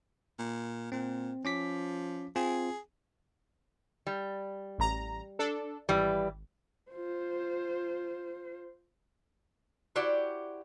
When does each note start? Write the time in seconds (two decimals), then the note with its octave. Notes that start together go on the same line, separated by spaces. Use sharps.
0.39 A#2
0.92 A#2 C4
1.45 F3 C#4 D6 B6
2.36 C4 F4 G#4 G#5
4.07 G3
4.78 A1 A#5
5.39 D4 A4
5.89 G#1 E3 G3
6.91 F4 C5
9.95 E4 F#4 G4 C5 D5